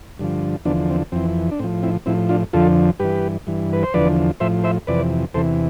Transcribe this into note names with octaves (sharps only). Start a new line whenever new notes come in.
G2 D3 F3
E2 D3 F3 B3 D4
C4
F2 E3 C4
D4
A2 F3 C4
C4 E4
A2 F3 C4 E4
D4 F4
F2 D3 F3 F4 A4
G2 E3 G4 B4
G2 E3
B4
C5
E2 D3 F3 B4 D5
A2 F3 C5 E5
C5 E5
F2 C3 E3 B4 D5
E2 C3 E3 A4 C5